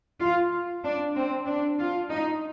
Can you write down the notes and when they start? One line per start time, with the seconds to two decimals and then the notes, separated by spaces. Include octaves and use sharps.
0.21 F4
0.84 D4
1.15 C4
1.47 D4
1.78 F4
2.10 D#4